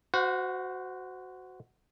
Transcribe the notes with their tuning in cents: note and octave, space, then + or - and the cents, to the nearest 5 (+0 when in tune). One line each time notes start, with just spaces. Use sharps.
F#4 +0 C5 -25 F#5 -45